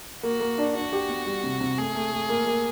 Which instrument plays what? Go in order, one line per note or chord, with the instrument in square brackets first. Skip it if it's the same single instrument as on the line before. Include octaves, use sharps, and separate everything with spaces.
[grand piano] A#3 [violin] F#4
[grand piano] A#3
D4
[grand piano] D4 [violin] F#4
[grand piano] G4
B3
G3
C3
C3
[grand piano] A3 [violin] G#4
[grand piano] A3
A3
A#3
A#3